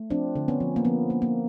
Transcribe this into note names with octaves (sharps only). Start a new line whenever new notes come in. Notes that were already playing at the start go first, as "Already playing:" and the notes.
Already playing: A3
F3 C4 D4
D3
B3 C#4
F3
A#3
F3 B3
A#3
A#3